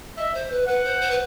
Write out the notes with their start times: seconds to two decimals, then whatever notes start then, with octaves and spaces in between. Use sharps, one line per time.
0.18 D#5 E5
0.34 C5
0.51 B4
0.68 B4 F#5
0.85 C5
1.01 C5
1.11 B4